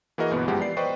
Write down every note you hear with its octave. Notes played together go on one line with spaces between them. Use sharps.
E3 A#3 F#4 G#4 A#4 D#5
G1 B2 E3 B3
F#2 F3 G#3 G4 F#5
B3 G4 D5 C7
B4 C5 D5 D#5 G5 C#6